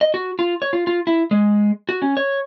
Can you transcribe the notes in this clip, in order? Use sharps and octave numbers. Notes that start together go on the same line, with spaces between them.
D#5
F#4
F4
C#5
F4
F4
E4
G#3
F#4
C#4
C#5